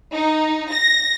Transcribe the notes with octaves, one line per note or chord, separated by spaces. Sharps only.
D#4
A#6